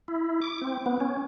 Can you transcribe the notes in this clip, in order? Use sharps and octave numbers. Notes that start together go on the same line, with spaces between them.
E4
D6
C4
B3
C#4